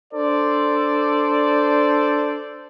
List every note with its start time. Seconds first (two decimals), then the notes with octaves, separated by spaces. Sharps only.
0.14 D4 A4 C5 D5